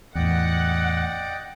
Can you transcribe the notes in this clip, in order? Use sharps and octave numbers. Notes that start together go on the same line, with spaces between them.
E2 A2 D5 D#5 F#5 G5